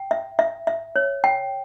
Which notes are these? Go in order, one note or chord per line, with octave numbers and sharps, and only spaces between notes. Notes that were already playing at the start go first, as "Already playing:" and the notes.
Already playing: G5
E5
E5
E5
C#5
G5